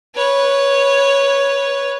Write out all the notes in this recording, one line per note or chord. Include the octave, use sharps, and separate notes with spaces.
B4 C#5